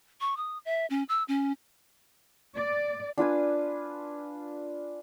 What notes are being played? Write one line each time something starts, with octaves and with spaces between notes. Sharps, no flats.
C#6
D#6
E5
C#4
E6
C#4
D5
D4 F4 B4 G#5